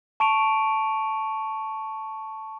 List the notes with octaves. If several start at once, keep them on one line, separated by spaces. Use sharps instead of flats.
A5 C#6 D7 D#7 F7